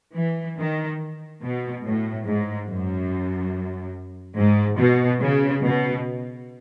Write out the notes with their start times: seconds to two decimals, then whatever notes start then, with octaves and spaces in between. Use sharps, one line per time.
0.15 E3
0.57 D#3
1.42 B2
1.83 A2
2.26 G#2
2.68 F#2
4.37 G#2
4.79 B2
5.21 C#3
5.64 B2